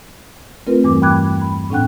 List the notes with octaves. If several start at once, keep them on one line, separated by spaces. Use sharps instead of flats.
A3 C4 F4 A#4 B4
E2 G2 E3 G3 F#4 D6
G5 B5 D6 F#6 G#6
B5
A2 C4 D4 F#5 G5 F#6